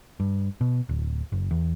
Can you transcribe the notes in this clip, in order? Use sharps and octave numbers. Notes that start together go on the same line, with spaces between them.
G2
B2
D1
F#1
E2